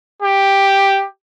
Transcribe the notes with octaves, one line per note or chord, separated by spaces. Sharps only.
G4